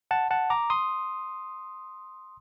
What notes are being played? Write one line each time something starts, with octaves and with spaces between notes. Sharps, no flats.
F#5 A5
F#5 A5
A#5 D6
C6 D#6